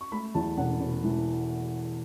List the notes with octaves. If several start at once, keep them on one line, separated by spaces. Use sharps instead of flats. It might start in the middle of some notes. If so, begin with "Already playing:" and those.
C#6
A3 B5
E2 A5
E1 F#5
E1
E3